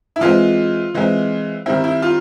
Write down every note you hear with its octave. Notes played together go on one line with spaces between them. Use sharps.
E4
E3 G#3 C4 F4
E3 G#3 C4
D#3 G3 C4 E4
E4
F4